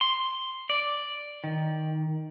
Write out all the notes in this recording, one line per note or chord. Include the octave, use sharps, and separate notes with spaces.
C6
D5
D#3